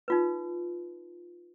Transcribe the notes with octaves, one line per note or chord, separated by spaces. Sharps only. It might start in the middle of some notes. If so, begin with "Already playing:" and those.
D#4 F4 B4